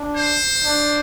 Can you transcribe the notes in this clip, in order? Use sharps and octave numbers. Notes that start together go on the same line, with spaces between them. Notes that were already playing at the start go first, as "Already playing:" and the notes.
Already playing: D4
C5
D4